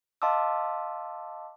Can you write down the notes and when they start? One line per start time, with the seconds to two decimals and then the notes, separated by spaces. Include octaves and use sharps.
0.22 D#5 F5 A5 C6 D6 E6